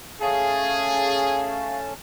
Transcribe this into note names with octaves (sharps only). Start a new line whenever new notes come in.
A3 C#4 G#4 F5 A5